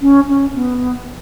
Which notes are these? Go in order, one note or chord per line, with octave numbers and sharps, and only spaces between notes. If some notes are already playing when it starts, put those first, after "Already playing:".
C#4
C#4
B3